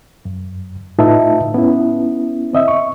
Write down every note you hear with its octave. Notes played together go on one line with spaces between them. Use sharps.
F#2
A2 D#4 F4 B4 E5 A5
B3 C#4 E4
C4 D#5 E5
C#6